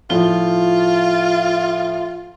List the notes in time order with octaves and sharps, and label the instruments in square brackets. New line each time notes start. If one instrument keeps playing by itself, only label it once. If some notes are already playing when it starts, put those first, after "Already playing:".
[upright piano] A2 F3 G7 [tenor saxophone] F4